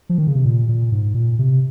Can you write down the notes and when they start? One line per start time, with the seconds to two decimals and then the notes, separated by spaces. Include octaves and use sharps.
0.09 F3
0.18 D#3
0.27 C#3
0.36 C3
0.45 A#2
0.69 A#2
0.92 G#2
1.14 A#2
1.39 C3